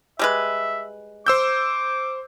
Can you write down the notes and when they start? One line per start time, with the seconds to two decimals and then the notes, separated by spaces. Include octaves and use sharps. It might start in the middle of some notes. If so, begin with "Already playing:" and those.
0.19 G3 G#3 B4 E5
1.26 C5 D6 E6 G6